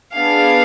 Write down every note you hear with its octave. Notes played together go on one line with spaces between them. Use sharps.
B3 D4 G#4 F5